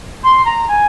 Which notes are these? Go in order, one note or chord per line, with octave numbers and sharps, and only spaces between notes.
C6
A#5
G#5